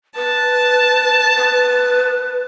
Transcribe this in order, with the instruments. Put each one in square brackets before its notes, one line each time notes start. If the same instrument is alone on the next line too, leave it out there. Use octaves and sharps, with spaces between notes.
[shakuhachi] B4 [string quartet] A5
[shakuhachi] B4